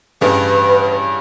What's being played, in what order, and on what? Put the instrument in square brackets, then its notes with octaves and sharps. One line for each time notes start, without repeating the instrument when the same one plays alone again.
[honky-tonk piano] A1 G2 C#3 [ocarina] B4